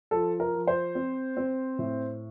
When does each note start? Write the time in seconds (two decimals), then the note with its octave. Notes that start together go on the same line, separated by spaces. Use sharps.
0.11 F3 A4
0.40 A#4
0.54 F3
0.67 C5
0.95 C4
1.37 C4
1.79 A2